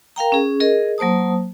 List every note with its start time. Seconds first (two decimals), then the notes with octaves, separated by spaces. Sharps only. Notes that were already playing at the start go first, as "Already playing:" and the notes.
0.16 A#4 F5 G5 A#5
0.32 C#4 G#4
0.60 G#4 A#4 D#5
0.98 F#3 A#3 C5 A5 D#6